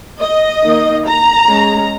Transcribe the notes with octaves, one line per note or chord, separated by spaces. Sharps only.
D#5
D#3 A#3 D#4
A#5
G#3 C#4